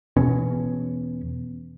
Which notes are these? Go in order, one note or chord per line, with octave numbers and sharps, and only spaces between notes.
E2 B2 C#4